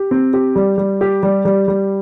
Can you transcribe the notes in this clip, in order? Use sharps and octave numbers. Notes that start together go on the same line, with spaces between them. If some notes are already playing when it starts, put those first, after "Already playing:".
Already playing: G4
C4
G4
G3
G3
G4
G3
G3
G3